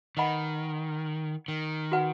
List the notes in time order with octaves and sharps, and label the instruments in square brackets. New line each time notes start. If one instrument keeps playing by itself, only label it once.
[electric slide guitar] D#3 [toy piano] B4 D#5 F#5 B5
[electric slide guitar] D#3
[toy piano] F#4 B4 F#5